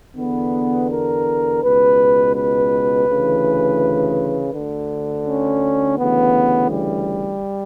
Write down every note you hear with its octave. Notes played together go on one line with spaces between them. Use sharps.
E2 D3 B3
A#4
C#2 B2 B4
B4
D2 C#3 E3
D2 D3
C#4
D2 C#3 E3 B3
G3